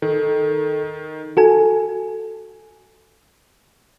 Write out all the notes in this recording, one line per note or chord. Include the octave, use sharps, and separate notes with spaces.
D#3 A4
F#4 A4 G#5